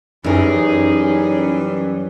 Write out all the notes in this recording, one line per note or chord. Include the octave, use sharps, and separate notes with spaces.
F#2 E3 G3 C#4 D#4 G#4 A#4